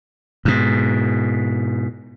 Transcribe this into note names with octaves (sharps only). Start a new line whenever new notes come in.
G#2 B2